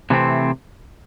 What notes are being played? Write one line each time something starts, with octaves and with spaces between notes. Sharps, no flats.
C3 E3 A3 C4